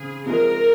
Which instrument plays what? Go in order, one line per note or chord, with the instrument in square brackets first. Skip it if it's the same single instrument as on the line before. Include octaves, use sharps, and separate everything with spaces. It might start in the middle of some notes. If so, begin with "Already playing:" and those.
Already playing: [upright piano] C#3 C4 [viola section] G#4
[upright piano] C3 F3 G#3 [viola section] A#4